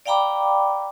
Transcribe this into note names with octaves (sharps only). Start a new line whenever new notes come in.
D5 F5 G5 A#5 B5 D6